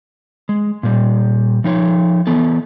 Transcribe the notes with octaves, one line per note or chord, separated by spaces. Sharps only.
G#3
A#2 G3
F3 D#4 C#5
E3 B3 A4